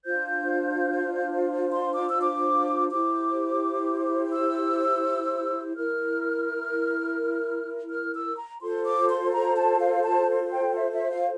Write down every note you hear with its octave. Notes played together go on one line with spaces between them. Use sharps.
D4 F4 C5 G6
C6
D6
E6
D6
E4 G4 C5 D6
E6
E4 A#4 F6
F6
E6
A#5
F4 A4 C5 C6
D6
C6
A#5
A5
F5
A5
G5
E5
E5
F5